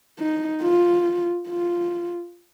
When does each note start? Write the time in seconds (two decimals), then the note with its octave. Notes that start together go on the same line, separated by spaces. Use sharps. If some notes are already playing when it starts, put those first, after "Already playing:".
0.19 D#4
0.62 F4
1.48 F4